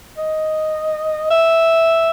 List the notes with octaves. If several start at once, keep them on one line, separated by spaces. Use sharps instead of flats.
D#5
E5